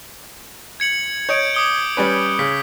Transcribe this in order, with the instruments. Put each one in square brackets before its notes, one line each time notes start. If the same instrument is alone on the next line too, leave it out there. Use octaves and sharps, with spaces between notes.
[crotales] G#6 C#7 F#7
[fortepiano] C#5 D#5 [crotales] G6 D7
[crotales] D6 D#6 G7
[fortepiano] G3 C#4 B4
[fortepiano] C#3 [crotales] B6